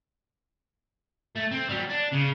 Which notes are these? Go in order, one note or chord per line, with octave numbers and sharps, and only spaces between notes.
A3
C4
F#3 G3
D4
C#3